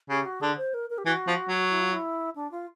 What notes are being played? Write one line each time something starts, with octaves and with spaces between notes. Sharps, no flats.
C#3 G4
F#4
D3 G#4
C5
A#4
A#4
G4
E3 F#4
F3
F#3
E4
F4
E4
D4
F4